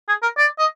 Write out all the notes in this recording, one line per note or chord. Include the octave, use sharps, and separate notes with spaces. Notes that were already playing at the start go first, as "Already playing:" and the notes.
G#4
A#4
D5
D#5